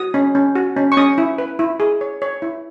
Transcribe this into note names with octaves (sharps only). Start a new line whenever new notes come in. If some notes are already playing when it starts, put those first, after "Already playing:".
Already playing: F#4 D#6
C#4
C#4
F#4
C#4
C#6
C#4 D#6
E4
B4
E4
G#4
C#5
C#5
E4